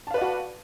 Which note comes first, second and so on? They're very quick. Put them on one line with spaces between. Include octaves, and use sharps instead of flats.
A5 F5 B4 D5 F#4